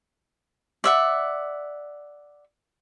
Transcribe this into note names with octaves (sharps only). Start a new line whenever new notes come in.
D5 E5 F#5